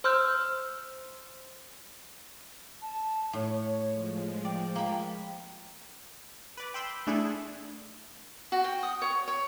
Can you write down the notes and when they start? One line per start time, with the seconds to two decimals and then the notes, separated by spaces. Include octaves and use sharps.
0.04 C5 C6 E6 F6 G6
2.82 A5
3.33 A2 C#5
3.89 F3 G#3
4.45 D5 G5
4.75 A#3 B5
6.57 B4 D5
6.74 G5 B5 C6 E6 B6
7.07 A3 D4 E4 G#4 A4
8.52 F#4
8.64 G5
8.83 D#6
9.02 C#5
9.28 C#5